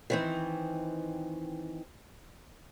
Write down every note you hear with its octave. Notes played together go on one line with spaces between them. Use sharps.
D#3 E3 C4